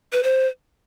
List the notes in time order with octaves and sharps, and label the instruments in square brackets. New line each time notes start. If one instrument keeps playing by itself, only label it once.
[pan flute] B4
C5